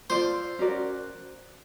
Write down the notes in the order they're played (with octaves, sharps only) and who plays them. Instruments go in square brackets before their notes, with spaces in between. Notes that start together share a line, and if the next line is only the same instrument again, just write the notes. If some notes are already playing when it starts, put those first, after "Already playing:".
[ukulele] F4 A4 D5 [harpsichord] C5
[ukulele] C#4 F#4 A#4 D5